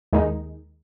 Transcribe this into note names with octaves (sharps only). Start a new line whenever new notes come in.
D#2 D#3 G#3 D#4